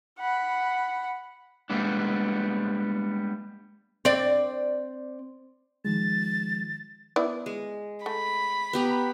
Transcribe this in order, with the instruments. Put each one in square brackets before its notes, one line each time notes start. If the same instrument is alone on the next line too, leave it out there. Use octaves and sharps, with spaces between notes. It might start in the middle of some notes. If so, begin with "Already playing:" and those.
[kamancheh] F#5 B5
[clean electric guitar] G3 G#3 A#3 B3 D4
[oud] C4 D5
[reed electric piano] D#3 F3 G#3 [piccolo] A6
[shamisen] B3 E4 D5
[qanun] G#3
[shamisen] A3 [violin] B5
[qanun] B3 G4 A#5